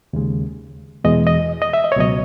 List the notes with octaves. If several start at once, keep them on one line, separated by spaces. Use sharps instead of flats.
D#2 C#3 G#3
E2 B2 G#3 D#5
D#5
D#5
E5
D#5
C#5
C#2 B2 F#3 D#5